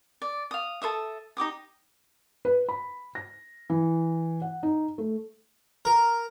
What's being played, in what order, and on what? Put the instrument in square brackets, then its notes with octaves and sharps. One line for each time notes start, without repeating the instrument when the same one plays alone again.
[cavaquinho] D5
F5 D#6
A4 C5 E5 D#6
D#4 G4 D6 D#6
[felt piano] B4
B5
A#6
E3
F#5
D#4
A3
[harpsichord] A#4